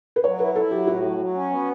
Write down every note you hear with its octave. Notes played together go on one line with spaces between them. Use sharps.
B4
F#3 C#5
E4 B4
E4 A4
F#3 G4
A2 F#4
F#3
F#3
C#4
B3